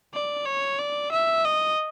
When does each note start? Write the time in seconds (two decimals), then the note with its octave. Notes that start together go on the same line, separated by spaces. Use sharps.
0.14 D5
0.46 C#5
0.79 D5
1.12 E5
1.45 D#5